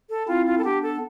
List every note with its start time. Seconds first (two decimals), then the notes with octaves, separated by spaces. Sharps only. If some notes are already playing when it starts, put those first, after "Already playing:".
0.10 A4
0.28 C4 E4 F4
0.46 F4
0.58 A4
0.64 B3 D4 G4
0.83 A4